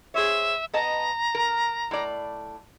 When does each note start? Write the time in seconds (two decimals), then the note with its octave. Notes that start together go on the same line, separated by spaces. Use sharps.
0.14 G#4 C5 C#5 E5
0.74 B3 D#5 A5 A#5
1.35 A#4
1.91 A2 D5